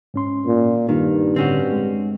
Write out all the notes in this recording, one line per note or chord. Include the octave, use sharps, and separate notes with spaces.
G#2 C#4 C6
A#2
G2 D#3 A#3
A2 D3 C4 C#4 F#4
G#3